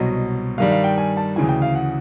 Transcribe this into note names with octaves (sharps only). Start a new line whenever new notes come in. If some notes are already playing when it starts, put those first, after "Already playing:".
Already playing: C2 B2 F#3 D#5
G2 D#3 G3 F5
F5
G5
G#5
A5
D2 C#3 E3 G#5
G5
F5
F#5